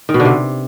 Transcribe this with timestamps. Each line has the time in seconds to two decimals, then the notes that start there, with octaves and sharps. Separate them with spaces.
0.09 D#3
0.14 B2
0.20 D3
0.25 C3